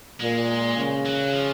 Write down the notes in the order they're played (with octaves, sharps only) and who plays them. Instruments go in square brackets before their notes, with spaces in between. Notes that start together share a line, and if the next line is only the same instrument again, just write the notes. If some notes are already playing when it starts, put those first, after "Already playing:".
[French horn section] A#2 [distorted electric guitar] G#3
[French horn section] C#3
[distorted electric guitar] F#3
F3